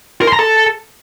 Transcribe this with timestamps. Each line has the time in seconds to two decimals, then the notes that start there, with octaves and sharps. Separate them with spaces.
0.22 A#4
0.27 C6
0.33 A#5
0.39 A4